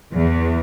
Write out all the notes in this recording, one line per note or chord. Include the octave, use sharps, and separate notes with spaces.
E2